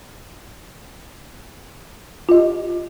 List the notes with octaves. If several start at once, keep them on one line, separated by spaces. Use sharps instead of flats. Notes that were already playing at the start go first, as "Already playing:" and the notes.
F4 G4 D#5